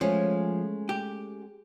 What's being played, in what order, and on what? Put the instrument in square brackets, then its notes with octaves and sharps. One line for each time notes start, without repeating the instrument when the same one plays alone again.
[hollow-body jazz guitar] F3 [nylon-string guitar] G#3 A3 C#4
[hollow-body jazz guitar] G4